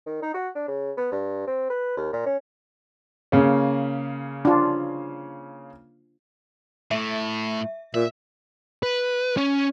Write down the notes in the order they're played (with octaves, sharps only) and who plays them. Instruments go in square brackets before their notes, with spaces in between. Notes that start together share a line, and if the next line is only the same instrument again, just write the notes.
[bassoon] D#3
D#4
F#4
D4
C#3
B3
G2
C4
B4
D#2
A#2
C#4
[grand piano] C#3 A#3 C#4
[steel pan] D4 F4
[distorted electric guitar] A2 A3 [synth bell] E5
[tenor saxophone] A#2 [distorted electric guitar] E5
[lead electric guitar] B4
C#4